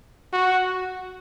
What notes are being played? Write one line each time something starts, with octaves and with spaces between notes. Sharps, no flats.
F#4